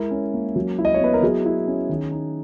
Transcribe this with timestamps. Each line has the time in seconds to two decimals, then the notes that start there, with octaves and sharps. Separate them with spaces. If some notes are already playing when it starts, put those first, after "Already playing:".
Already playing: G#3 E4 A#4
0.11 C#4
0.34 A#3
0.56 F#3
0.79 E4
0.85 D#5
0.94 C#5
1.00 B3 B4
1.14 A#4
1.22 F#3 G#4
1.45 E4
1.67 C#4
1.89 D#3
2.11 D#4